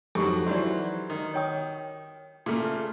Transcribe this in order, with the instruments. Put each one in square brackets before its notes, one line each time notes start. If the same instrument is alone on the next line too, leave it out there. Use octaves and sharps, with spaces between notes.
[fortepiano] F2 F#3 [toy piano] D#4 G4 A4
[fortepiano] E3 F#3 C5 [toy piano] F#4 D5
[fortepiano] D#3
[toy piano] C#5 G5 D#6
[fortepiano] A#2 C#3 A3